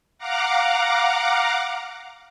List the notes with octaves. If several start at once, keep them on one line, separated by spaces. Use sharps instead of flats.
F5 F#5 A#5 D6